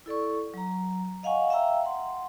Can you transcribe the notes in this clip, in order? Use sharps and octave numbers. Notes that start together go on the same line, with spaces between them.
E4 A4 D5 C#6
F#3 A#5
D#5 F5 F#5 G#5 C#6
E5 F5 G5 A#5 E6
F#5 C6